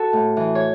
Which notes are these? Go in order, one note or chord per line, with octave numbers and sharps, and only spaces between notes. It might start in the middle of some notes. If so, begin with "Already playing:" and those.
Already playing: F#4 A4
A2
E3
C#5